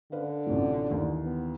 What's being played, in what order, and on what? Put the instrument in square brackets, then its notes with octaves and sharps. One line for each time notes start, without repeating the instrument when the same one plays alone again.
[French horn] D3 [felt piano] B4 F5
[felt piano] A1 C3 F3
D#2 E3
[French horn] B3